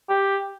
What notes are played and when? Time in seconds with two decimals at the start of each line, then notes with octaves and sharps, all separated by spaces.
0.09 G4